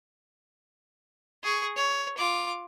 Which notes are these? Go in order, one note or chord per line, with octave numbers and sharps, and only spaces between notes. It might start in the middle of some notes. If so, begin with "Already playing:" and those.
G#4 C#6
C#5
F4 D6